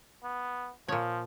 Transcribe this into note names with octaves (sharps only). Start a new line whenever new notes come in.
B3
A#2 F3 C#5